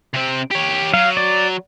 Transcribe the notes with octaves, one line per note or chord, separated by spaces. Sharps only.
C3 C4
G4 C#5
F#3 F5
D5